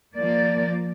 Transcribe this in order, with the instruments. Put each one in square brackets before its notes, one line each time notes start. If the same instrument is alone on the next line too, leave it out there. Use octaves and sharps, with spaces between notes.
[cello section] F3 A#3 D5